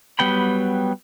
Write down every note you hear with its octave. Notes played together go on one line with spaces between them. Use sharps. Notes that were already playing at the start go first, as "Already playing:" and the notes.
F#3 G3 B3 G5 B5